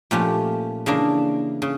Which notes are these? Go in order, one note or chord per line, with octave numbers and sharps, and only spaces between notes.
A#2 F3 A3 C#4 G4
C#3 E3 A#3 D4
C#3